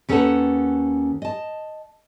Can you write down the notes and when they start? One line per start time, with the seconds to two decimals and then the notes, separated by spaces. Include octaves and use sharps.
0.09 D#2 C#4 A4 B4 F#5 A5
1.22 D#5 A5